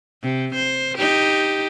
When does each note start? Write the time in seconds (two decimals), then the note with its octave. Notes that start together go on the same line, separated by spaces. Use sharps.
0.23 C3
0.55 C5
0.98 D#4 G4